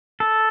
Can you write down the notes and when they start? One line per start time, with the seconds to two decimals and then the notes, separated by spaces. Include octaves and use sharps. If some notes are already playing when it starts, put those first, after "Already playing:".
0.20 A4